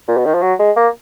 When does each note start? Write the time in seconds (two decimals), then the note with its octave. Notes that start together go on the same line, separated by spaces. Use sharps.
0.08 A#2
0.17 B2
0.25 D#3
0.34 F3
0.42 F#3
0.59 G#3
0.76 A#3